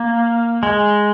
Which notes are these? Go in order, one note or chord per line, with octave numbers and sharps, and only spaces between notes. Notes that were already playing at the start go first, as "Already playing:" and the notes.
Already playing: A#3
G#3